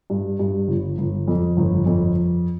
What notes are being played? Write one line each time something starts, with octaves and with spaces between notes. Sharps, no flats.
G2
G2
G1
G1
F2
G1
F2